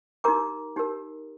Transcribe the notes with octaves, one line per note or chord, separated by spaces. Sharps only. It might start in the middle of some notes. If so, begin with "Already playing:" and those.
D#4 G4 A#4 A#5 D6
D#4 G4 A#4